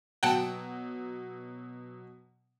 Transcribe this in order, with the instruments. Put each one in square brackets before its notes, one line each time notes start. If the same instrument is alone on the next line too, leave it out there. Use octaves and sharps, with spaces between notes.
[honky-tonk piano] B2 F#3 [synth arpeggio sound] F#5 G5 A5